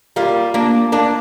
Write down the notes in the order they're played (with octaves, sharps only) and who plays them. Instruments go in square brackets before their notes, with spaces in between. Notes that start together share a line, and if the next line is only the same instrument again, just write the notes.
[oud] G3 A#3 [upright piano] F4
[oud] A#3 D4
A#3 D4